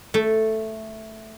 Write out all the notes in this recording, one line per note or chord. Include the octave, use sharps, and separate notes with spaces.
A3